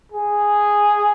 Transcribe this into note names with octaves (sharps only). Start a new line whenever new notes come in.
G#4